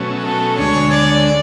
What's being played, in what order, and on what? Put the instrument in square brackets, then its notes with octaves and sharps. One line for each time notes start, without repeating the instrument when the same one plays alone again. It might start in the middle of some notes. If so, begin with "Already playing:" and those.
Already playing: [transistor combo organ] B2 F#3 A3 C#4
[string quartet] A4
[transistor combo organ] D2 D3 G#3 [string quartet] C#5
[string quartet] D5